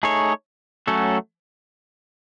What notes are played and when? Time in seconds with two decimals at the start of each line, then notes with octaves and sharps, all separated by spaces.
0.03 A3 D#4 G#4 C#5
0.87 F#3 A3 C#4 F#4 A4